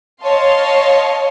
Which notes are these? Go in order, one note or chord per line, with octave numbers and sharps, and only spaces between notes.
C#5 D#5 F5 A5 C6